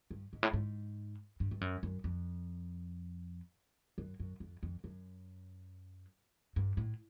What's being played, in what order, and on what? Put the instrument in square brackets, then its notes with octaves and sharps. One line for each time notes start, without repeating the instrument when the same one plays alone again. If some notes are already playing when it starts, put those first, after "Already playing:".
[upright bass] G2
G#2
A2
G#2
G2
G2
F#2
F#2
F2
F#2
F#2
F2
F2
F#2
G2
A2